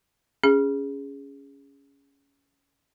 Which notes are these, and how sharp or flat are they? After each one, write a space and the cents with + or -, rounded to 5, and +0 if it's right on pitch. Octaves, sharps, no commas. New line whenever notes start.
C#4 +15 G#4 -15